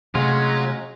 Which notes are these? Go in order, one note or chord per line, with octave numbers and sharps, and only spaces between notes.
C3 F#3 G#3 A3 C#4 F4